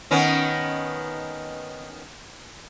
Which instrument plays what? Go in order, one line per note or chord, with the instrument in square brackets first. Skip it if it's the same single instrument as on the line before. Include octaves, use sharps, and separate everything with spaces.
[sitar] D#3 B3 C#4